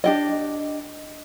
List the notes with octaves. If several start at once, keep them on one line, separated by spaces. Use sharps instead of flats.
D4 G4 D#5